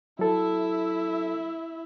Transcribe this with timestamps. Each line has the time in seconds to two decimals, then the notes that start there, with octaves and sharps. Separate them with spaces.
0.19 F#3 E4 A4 E5